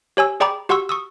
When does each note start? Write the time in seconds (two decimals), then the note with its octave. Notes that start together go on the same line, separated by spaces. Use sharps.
0.17 G4 C#5 G#5 E6
0.40 G#4 D5 G5 A#5 B5 D6
0.69 F#4 G4 F#5 C6 C#6 E6
0.89 C#6 D#6 E6